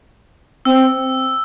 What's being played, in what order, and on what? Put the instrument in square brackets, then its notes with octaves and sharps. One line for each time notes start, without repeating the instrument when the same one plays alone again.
[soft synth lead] C4 [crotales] E6